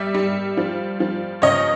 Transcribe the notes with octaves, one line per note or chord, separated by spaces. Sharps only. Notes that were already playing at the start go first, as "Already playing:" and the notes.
Already playing: G3 D5 E5
G3
F3
F3
C#2 C#5 D#5